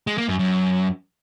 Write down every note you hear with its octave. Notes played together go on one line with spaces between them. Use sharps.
G#3
A#3
F#2
F#2